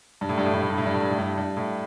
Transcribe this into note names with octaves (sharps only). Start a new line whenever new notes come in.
G2
A2
G2
A2
G2
A2
G2
A2
G2
A2
G2
A2
G2
G2
A2